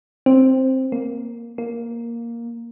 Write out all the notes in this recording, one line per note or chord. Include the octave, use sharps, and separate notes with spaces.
C4
A#3
A#3